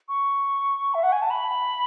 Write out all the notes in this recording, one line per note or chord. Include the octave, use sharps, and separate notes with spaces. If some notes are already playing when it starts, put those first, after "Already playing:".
C#6
E5
F#5
G#5
A5
B5